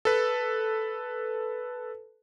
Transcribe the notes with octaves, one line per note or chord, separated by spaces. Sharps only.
A4 B4